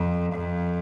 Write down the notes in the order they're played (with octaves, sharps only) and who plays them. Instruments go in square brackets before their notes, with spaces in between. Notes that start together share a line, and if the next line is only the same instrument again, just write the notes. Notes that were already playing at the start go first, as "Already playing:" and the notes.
Already playing: [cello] F2
F2